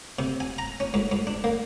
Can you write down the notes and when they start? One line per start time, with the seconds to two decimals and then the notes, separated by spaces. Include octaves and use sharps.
0.19 C3
0.40 G#5
0.58 A#5
0.80 C#4
0.94 G#2
1.12 G#2
1.27 D4
1.44 A#3